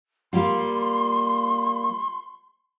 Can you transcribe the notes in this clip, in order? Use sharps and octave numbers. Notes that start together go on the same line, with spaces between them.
G3 A#3 F4 C6